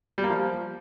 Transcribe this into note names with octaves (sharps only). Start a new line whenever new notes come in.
G3
A#3
F3